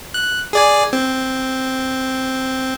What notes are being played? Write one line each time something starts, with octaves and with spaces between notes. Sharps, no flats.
F#6
G#4 D5 G#5
C4